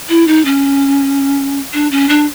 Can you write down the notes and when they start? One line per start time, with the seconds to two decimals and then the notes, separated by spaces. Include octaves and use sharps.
0.09 E4
0.27 D#4
0.45 C#4
1.73 D4
1.91 C#4
2.08 D4